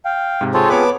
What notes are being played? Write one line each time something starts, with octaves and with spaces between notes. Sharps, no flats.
F5 G5
G#2 C3
C4 F4 G#4 A4 C5 C#5
B3 B4 C#5 A5 D6